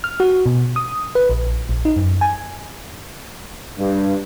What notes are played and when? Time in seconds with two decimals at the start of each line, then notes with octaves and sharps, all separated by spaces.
0.04 F6
0.20 F#4
0.46 B2
0.76 D#6
1.15 B4
1.30 A#1
1.69 A#1
1.85 D#4
1.96 F#2
2.21 G#5
3.78 G2